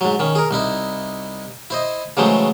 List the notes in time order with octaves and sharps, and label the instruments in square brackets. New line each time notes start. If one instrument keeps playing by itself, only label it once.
[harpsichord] G#2 F#3
D#3 C#4
G#4 A#4
C2 D#4 E4
E4 C5 D#5
C#3 E3 F#3 G#3 A3 C5